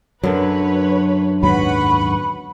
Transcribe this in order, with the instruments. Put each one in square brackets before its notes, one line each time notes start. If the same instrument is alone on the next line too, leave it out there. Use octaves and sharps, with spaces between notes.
[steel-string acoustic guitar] F#2 D3 [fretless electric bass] F#3 [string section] B4 C#5
[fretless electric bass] D#2 G#2 F#3 [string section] B4 F#5 C#6 [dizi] B5